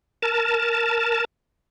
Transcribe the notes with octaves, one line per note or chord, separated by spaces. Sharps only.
A#4 A5